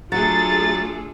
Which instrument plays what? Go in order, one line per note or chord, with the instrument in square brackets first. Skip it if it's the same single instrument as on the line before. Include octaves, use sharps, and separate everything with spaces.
[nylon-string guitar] F#3 [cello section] A3 G#4 A4 [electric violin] D4 F4 [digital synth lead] A6